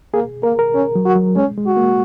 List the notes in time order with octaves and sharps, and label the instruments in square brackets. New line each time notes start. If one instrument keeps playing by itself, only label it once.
[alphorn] A#3 [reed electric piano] G#4
[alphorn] A#3 [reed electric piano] A#4
[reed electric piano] A#4
[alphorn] C#4
[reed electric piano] F#3
[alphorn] F#4
[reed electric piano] F#3
[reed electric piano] G#3 [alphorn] C#4
[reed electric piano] G#3
[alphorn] F#4
[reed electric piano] A#3